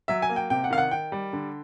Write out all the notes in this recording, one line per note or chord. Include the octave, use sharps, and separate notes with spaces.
F#3 E5
G#5
A#3
G5
C3 G5
F#5
D#3 F5
F#5
D#3 G5
G3
D3